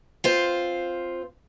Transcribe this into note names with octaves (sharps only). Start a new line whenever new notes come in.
C4 F4 C5